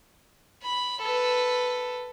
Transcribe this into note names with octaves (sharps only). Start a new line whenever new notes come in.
B5
A4 B4